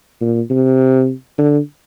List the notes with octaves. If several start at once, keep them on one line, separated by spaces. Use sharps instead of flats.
A#2
C3
D3